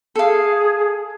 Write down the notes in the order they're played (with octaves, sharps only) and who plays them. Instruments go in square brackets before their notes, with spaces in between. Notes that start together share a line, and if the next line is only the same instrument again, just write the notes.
[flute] G#4 [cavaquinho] A4 F5